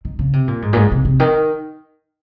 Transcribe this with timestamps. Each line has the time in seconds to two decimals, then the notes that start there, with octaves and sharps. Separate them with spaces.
0.05 D#3
0.19 C#3
0.33 C3
0.48 A#2
0.62 G#2
0.73 A#2
0.77 G#2
0.91 C3
1.05 C3
1.20 D#3